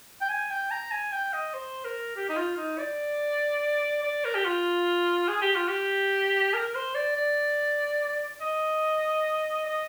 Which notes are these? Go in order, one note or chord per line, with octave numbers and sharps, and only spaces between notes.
G5
G#5
G5
A#5
G#5
G5
D#5
C5
A#4
G4
D#4
F4
D#4
D5
D5
A#4
G4
F4
G#4
G4
F4
G4
A#4
C5
D5
D5
D#5
D#5